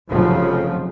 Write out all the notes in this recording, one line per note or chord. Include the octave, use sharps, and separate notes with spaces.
F1 F2 C#3 F3 F#3